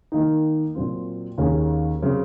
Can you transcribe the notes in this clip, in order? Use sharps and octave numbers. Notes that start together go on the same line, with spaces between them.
D#3 A#3 D#4
A#2 F#3 C4 F4
D#2 D#3 A#3 C#4 G#4
C#3 F#3 C4